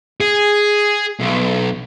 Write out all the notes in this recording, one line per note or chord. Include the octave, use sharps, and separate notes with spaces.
G#4
B1